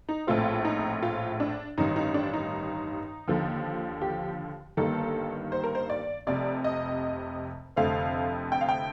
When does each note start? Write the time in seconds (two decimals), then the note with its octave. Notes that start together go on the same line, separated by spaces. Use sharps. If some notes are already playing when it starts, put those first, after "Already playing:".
0.09 D#4
0.27 A#1 A2 A3 C4 F4
0.65 D#4
1.02 F4
1.40 D4
1.78 A1 G2 D#3 D#4
1.96 D#4
2.14 D4
2.33 D#4
3.28 D#2 D3 F3
4.02 G4
4.77 G1 G2 D#3 A#3 A4
5.52 C5
5.64 A#4
5.75 C5
5.90 D5
6.27 F1 F2 C3 D5
6.64 D#5
7.76 F1 F2 D3 A3 C4 F5
8.52 G5
8.61 F5
8.69 G5